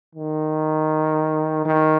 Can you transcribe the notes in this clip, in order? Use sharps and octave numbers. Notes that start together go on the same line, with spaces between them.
D#3
D#3